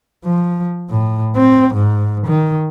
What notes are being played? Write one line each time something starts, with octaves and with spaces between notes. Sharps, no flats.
F3
A2
C4
G#2
D#3